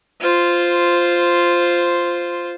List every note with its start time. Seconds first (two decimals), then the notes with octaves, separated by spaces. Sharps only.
0.21 F4 C5